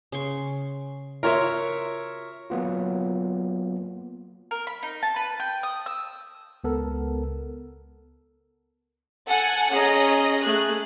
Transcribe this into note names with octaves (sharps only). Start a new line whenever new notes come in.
C#3 C6 C#6
F4 F#4 A#4 C#5 E5
F#3 A#3 B3 F4
A#4
B5
D#4
A5
B4
G5
D#6
E6
C#2 B3 A4 A#4
A4 F#5 G#5
C#4 G#4 D#5 A#5
A3 G#4 F#6